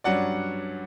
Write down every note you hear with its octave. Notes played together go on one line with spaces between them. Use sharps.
G2 F#3 C#4 D5 F#5